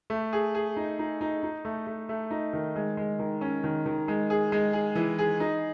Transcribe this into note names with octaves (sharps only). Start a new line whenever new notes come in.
A3
G#4
G#4
D#4
D#4
D#4
D#4
A3
A3
A3
D#4
D#3
G#3
G#3
D#3
C#4
D#3
D#3
G#3
G#4
G#3
G#4
E3
G#4
D#4